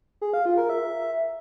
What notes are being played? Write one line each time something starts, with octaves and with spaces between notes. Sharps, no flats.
G#4
F5
F4
A#4
E5